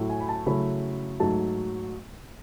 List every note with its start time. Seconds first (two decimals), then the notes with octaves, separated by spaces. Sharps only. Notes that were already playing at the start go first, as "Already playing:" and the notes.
Already playing: A2 F#3 A3 E4
0.10 G#5
0.21 B5
0.29 A5
0.46 C#3 F#3 A3 C#4 E4 B5
1.20 G#2 F#3 A3 A5